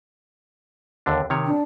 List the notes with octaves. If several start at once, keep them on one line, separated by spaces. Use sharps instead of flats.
D#2 D3 D4
C3 D#3 C#5
D4